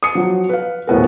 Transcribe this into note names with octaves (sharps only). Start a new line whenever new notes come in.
D#6 C#7
F3 F#3
B4 F5
D#1 A2 B3 A#4